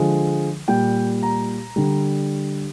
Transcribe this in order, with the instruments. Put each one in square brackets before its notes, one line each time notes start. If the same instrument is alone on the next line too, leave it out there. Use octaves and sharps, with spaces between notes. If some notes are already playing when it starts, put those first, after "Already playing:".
Already playing: [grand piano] D3 F3 G#3
A#2 G3 G5
A#5
D3 G3